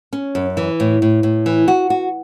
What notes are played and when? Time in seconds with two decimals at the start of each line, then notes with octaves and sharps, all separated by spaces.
0.13 C#4
0.35 F#2
0.57 E3
0.80 A2
1.02 A2
1.23 A2
1.46 E3
1.68 F#4
1.90 F#4